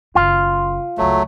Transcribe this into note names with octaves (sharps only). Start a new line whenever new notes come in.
F#1 D#3 F4
F#1 C#2 F#3 A3